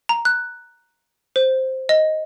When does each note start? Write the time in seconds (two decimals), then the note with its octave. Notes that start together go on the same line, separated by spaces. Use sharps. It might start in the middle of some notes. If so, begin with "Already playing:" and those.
0.09 A#5
0.25 F#6
1.36 C5
1.89 D#5